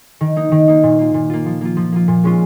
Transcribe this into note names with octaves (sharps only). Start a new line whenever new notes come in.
D#3
A#3 D#4
D#3
A#3 D#4
A#2
A#3 F4
A#2
A#3 F4
F3
A#3 F4
F3
A#3 F4
A#2
G#3 C#4 F4